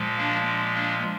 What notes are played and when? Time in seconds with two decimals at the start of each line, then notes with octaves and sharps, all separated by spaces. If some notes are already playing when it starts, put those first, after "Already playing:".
Already playing: A#2 F3 G#3
0.17 A#3 D4
0.74 A#3 D4